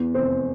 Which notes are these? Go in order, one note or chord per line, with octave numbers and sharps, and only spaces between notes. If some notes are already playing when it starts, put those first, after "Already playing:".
Already playing: E2
F1 C5